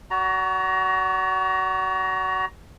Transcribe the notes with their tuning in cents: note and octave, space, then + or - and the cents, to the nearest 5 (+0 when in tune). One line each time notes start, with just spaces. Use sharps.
F#4 +20 D5 -40 A#5 +10